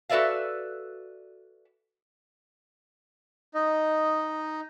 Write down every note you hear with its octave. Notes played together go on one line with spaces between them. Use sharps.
F#4 A4 B4 D5 E5 F5
D#4 D#5